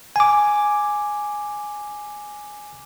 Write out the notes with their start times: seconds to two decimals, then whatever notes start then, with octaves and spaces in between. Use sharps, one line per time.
0.16 G#5 D6